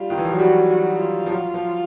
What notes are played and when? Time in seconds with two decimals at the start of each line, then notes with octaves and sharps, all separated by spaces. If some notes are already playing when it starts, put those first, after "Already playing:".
Already playing: G3 F4
0.10 D#3
0.18 E3
0.24 F3
0.32 F#3
0.39 G3 F#4
0.69 F#4
1.00 F4
1.26 F3
1.30 F#3
1.54 F3